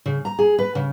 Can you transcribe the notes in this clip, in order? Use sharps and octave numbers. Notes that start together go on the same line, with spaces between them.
C#3
A#5
G#4
B4
C#3